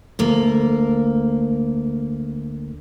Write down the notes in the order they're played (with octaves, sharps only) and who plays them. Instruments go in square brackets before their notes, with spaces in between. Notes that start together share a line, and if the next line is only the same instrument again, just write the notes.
[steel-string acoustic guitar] D2 A#3